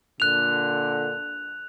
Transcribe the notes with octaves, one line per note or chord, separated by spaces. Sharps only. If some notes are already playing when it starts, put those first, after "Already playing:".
A#2 D3 F#6 F7